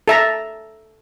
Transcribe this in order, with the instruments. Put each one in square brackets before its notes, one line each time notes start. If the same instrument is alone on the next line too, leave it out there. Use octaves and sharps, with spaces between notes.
[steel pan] A4 E5 A#5